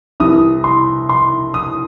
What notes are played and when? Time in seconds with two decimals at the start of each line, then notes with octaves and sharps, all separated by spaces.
0.20 C2 C3 E3 D#6
0.64 C6
1.09 C6
1.54 D#6